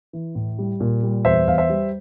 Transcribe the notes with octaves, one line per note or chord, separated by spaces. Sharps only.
E3
A2
G3
A#2
G3
E2 C5 E5
E2 F5
C5 E5
G3